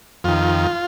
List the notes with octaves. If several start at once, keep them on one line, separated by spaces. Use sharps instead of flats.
F2 D#3 F4